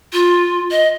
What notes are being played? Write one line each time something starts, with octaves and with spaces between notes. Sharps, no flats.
F4
D#5